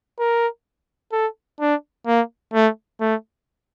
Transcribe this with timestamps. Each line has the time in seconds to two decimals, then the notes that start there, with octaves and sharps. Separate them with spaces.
0.19 A#4
1.12 A4
1.60 D4
2.07 A#3
2.54 A3
3.00 A3